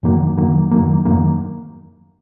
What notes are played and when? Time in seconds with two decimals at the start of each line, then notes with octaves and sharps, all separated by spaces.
0.03 F#2 D#3 F#3 A#3
0.37 F#2 D#3 F#3 A#3
0.71 F#2 D#3 F#3 A#3
1.05 F#2 D#3 F#3 A#3